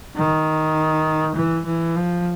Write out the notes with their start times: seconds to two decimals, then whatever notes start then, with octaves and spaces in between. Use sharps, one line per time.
0.16 D#3
1.35 E3
1.66 E3
1.96 F3